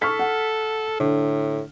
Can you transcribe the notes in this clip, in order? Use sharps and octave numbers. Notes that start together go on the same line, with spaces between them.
A4 C#6 F6 B6
F#5
A2 D3